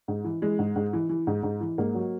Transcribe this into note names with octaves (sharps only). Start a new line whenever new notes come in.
G#2
E3
E3 G#3
G#2
G#2
E3
E3
G#2
G#2
E3
G#2 A#3
F#3